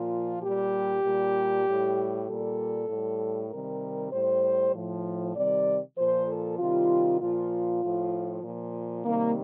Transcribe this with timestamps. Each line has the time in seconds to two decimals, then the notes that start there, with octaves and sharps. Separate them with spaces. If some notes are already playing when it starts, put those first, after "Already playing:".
Already playing: A#2 F3 F4
0.42 A#2 G3 G4
1.04 A#2 G3
1.65 A2 G3
2.27 A#2 G3 A4
2.89 A2 G3
3.50 C3 D#3 G3 A#4
4.12 A2 G3 C5
4.74 A2 F3
5.35 C3 D#3 G3 D5
5.97 A#2 F3 C5
6.28 A4
6.59 C3 D#3 G3 F4
7.20 A#2 F3 F4
7.82 A2 F3
8.44 A#2 F3
9.05 C3 D#3 G3 A#3